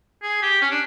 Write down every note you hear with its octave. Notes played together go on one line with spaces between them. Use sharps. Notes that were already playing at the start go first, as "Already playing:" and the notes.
G#4
G4
C#4
D4